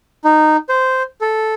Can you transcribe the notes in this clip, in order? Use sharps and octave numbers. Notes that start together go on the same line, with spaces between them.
D#4
C5
A4